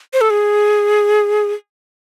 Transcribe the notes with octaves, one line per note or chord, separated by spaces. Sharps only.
C5
A4
G#4